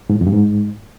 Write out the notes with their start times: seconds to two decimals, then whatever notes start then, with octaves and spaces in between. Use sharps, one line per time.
0.10 G#2
0.15 A2
0.21 F2
0.27 G2
0.32 G#2